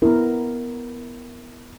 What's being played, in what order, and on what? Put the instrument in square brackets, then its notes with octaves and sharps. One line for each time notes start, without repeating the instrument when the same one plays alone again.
[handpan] B3 A#4 [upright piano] E4